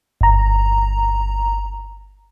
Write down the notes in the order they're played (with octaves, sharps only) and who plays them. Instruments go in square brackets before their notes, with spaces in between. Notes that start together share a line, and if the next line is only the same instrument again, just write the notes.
[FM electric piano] G1 A#5